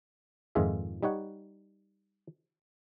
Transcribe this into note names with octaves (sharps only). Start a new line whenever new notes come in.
F2 G#2 D#3 F4 G#4 E5
G3 D#4 C#5 F#5